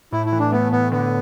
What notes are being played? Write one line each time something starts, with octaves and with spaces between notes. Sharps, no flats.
A2 E4
E4
E3
D4
A3 B3
A2 B3
D3 B3